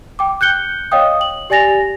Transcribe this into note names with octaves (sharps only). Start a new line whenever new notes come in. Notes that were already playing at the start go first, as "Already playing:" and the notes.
G5 D6
F#6 G6 C#7 G7
C#5 D#5 F5 G5 D#6
F#7
G4 D5 G#5 A6 A#6 F7